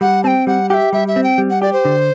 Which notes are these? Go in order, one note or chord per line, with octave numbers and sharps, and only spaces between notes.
G3 F#5
C4 G5 A5
G3 F#5
G4 E5 F#5
G3 E5
E5
C4
G5
G3
F#5
G4 D5
C5
D3